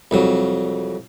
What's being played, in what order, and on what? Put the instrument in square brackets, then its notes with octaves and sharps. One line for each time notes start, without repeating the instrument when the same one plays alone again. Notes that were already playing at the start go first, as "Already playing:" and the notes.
[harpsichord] C2 F2 F#3